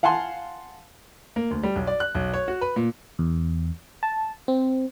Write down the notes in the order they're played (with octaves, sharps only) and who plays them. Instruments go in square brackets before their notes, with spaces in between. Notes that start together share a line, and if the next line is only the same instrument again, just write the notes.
[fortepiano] F5 F#5 G#5 A5 C6
[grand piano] A#3
D2
G3
B1
D5
F#6
B1
C#5
F#4
B4
A#2
[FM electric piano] E2
A5
C4